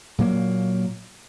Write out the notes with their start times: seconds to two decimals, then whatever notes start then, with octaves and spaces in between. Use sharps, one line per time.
0.18 A#2 F#3 A#3